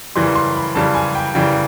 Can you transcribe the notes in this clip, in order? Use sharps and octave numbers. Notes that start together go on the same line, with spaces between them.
F#2 C#3 E3 G3 C6
C6
B5
F#2 C#3 E3 G3 A5
G#5
G5
F#2 C#3 E3 G3 G5